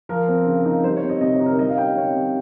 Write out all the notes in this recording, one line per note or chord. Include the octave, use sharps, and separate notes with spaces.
F3 A#4
C4
C#3
D#4
G3 C5
C#5
C4
D#5
C3 D#5
C#5
D#4
A#4
G3 D#5
F5
C#4 G5
D#5
C3 C#5
C3